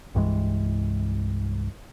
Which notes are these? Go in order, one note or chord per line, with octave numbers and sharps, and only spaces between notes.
C2 G2 E3 G#3